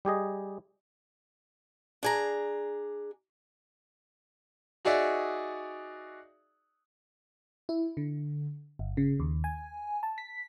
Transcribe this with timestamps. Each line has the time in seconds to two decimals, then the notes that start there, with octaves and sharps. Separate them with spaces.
0.05 G3 G4 G#4 D#5
2.03 D4 G#4 A#5
4.85 D#4 F#4 G#4 D5 E5
7.69 E4
7.97 D3
8.79 G1
8.97 C#3
9.20 D#2
9.44 G#5
10.03 A5
10.18 B6